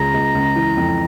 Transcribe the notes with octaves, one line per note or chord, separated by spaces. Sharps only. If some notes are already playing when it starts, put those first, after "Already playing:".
Already playing: C#2 C#3 A#5
C#2
C#2
E3
F2